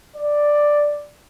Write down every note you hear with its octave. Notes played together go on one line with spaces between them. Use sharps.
D5